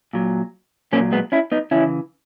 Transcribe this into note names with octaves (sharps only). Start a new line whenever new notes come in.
A#2 F#3
A#2 F#3 A#3 C#4
G#3 B3
C#4 E4
B3 D#4
C#3 E3 C#4 E4